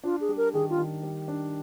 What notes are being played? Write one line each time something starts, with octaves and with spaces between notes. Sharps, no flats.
D4 F4
G#4
G3
A#4
D#3 G#4
F4
D#3
G3
D4